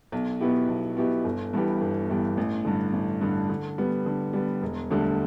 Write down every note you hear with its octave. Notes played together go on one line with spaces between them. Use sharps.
B1
B2 B3 E4 G4
B1
B2 B3 E4 G4
G1
G2 E3 B3 G4
G1
G2 E3 B3 G4
A1
G2 D3
A1
G2 D3
D3
G3 B3
D3
G3 B3
E1
D2 D3 G3